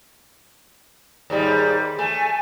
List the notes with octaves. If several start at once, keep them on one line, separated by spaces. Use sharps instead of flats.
D#2 G#2 G3
A3 G#5